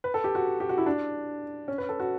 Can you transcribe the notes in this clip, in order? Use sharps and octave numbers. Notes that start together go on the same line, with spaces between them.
B4
A4
G4
F#4
G4
F#4
E4
D4
C#4
B4
A4
F#4